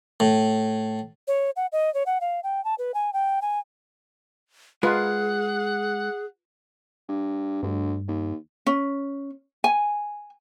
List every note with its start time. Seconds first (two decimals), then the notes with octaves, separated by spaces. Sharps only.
0.20 A2
1.28 C#5
1.56 F#5
1.72 D#5
1.94 C#5
2.06 F#5
2.21 F5
2.43 G5
2.65 A5
2.78 B4
2.94 G#5
3.13 G5
3.42 G#5
4.83 G#3 F4 G#4 A#4 B4 F#5
7.08 G2
7.63 D2 G2
8.08 D#2
8.66 C#4
9.64 G#5